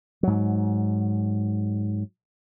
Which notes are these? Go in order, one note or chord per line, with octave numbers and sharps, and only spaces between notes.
G#2 F#3